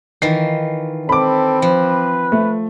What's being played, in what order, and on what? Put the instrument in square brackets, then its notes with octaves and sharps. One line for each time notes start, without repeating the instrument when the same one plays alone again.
[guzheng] D#3 E3 F4 [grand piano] C7
[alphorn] C4 [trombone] A4 [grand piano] B5 D6
[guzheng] F3 [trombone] B4
[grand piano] A3